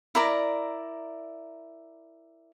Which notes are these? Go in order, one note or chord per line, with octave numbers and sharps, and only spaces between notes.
E4 A#4 D5 A#5